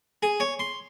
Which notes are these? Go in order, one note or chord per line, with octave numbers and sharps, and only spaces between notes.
G#4
C#5
C6